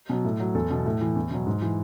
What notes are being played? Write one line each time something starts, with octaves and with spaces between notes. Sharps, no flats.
B2 F#3
A2
F#3
E2 A4
B2 F#3
A2
E3
E2
B2 F#3
G#2
E3